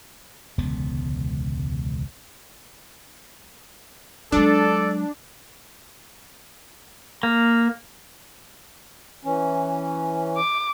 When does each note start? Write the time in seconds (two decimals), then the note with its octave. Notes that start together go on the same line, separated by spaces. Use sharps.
0.58 E1 C#2 D3 B3
4.32 F#3 G#3 D4 A4 D5
7.23 A#3
9.25 E3 C#4
10.37 D6